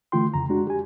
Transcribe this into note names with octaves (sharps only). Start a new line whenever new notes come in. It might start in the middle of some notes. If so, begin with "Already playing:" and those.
D3 E3 A3 F4 G5 C6
F2 C#3 A#5
G#3 D4 F#4
G4 G#5